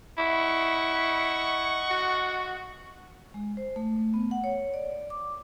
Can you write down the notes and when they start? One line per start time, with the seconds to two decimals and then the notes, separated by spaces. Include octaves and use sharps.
0.18 E4 D#5 F#5 C#6
1.90 F#4
3.34 G#3
3.57 C5
3.76 A3
4.14 B3
4.31 F#5
4.44 C#5
4.74 D5
5.10 D6